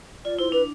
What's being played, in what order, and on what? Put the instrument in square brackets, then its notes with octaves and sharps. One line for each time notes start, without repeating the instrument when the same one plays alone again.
[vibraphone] F4 [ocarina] D5
[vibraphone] E4 [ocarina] C5
[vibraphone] D4 [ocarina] B4